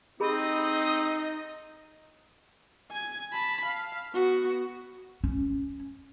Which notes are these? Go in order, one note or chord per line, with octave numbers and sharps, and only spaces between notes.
C4 D#4 G4 G#4 D#5 B5
G#5 G#6
A5 B5
F5
B3 F#4
C#4